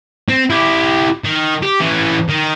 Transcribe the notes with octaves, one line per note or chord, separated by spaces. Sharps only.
C4
E4 G4
D#3
G4
E3 C#4
D#3